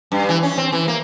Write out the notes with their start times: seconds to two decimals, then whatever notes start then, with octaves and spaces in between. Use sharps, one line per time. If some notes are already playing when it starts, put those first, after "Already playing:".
0.12 G2
0.29 E3
0.43 C#4
0.58 C4
0.72 E3
0.88 A#3